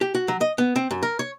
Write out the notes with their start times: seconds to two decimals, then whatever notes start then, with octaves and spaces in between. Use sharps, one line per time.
0.01 G4
0.15 F#4
0.28 F#3
0.41 D#5
0.58 B3
0.76 C4
0.91 F#2
1.03 A#4
1.19 C#5